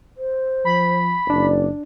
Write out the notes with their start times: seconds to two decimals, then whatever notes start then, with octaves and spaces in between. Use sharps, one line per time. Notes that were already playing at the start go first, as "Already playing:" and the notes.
0.17 C5
0.65 F3 B5
1.30 F#1 D4 D5